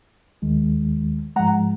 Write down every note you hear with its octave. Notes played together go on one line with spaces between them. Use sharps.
D#2 D#3 G#3
G#2 F3 G#3 F#5 A#5